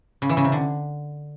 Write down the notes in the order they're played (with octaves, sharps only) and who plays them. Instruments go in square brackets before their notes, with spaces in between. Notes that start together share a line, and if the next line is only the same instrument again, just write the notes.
[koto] C#3
E3
C#3
C3
D3